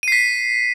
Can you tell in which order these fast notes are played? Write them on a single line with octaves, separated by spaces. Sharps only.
D#7 C7 B6